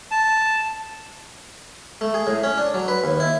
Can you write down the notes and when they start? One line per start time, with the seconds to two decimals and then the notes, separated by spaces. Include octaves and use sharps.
0.11 A5
2.01 A3
2.14 G#4
2.27 A2
2.43 C#4
2.58 D4
2.74 F#3
2.88 B4
3.04 D#2
3.20 E4